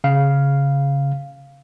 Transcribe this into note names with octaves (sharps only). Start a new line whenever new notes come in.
C#3 F5